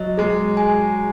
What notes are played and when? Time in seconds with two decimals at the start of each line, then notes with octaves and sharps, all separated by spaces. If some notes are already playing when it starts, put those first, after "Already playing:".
Already playing: F#3 D#5
0.18 G#3 G#4
0.57 G#5